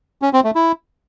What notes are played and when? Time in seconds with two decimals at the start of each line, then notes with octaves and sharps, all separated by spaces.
0.22 C#4
0.33 C4
0.44 A3
0.55 E4